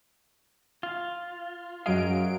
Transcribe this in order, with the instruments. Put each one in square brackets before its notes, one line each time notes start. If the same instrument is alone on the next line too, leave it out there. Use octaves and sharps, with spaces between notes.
[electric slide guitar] F4
[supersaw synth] F#2 F#3 D7 [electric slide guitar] G#4 D#5 F5